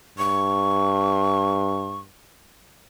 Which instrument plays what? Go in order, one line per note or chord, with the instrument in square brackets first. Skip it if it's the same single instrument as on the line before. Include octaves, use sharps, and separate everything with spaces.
[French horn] G2 [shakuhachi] C#6